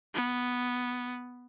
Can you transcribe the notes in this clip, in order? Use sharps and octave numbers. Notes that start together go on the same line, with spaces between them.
B3